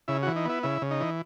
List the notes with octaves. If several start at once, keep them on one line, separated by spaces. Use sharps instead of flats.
C#3 E4
E3 F#4
D#4
B3 E4
C#3 E4
C#3
D#4
E3